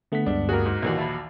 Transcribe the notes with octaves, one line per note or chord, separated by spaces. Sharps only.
D3 A3 B3 F#5 B6
D2 G2 G#3 D4
G3 A#3 F#4 G#4 A#4
G#2
A#1 D#2 D#3 E3 F#4
E5 A5 B5